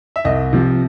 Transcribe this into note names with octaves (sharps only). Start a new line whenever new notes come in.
E5
C2 D#5
C3 F3